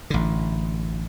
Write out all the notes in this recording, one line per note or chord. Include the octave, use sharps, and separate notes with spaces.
A1 D3